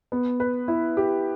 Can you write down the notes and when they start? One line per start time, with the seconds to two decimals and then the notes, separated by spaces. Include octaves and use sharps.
0.12 B3
0.40 B4
0.68 E4
0.97 G4